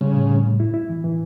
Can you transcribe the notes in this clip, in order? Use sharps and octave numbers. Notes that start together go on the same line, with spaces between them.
C#3 G3
A2
A2
A2
E4
E4
E3
E3